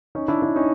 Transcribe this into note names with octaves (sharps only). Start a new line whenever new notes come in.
C#4 D#4
D4 E4
D4 E4
C#4 D#4